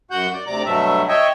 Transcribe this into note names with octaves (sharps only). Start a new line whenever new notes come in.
F#2 F#4 F#5 G6
D5
D2 C3 D5 A#5 D6
G2 B2 F#3 A3 E5
C#5 D#5 E5 G5